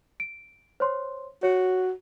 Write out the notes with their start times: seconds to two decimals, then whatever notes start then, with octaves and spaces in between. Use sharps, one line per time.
0.20 D7
0.80 C5 C#5 C6
1.43 F#4 C#5